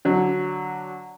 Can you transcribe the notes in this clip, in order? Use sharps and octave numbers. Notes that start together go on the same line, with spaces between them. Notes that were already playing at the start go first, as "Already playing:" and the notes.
D3 F#3 D4